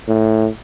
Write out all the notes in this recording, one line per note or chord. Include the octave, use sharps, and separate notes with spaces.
A2